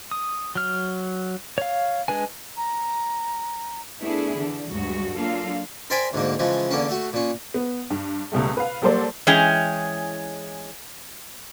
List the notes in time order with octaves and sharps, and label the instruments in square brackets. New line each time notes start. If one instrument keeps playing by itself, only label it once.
[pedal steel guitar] D#6
F#3 F6
C#5 F5
G#3 D4 B4 G#5
[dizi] A#5
[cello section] A3 B3 D4 E4 G#4
D3 E3 D4
D2 G2 F#3 G#3 F#4
F#3 A#3 D4 F4 A4 F5
[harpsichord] A#4 C5 D5 G5 G#5 B5
D2 G#2 D3 A#3
C#3 E3 F3 G#3
E2 D3 A#3 C#4
A3 F#4
A#2 C#4
[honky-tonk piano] B3
G2
C#2 B2 G3 A3
B4 F5
F#3 G3 A#3 A4 C5 D5
[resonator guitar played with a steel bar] E3 G#3 C#4 G#4 G5